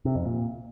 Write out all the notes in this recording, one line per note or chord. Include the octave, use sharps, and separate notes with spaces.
C3
F2
A#2